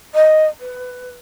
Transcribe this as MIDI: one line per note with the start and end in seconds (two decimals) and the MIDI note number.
0.14 0.45 75
0.60 1.12 71